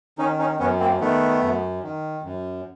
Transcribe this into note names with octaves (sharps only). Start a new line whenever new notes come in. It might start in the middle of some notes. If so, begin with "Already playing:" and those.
D#3 C#4 D#4
C#4 D#4
F#2 B3 C#4
A#3 C4
D#3 A3 B3
F#2
D#3
F#2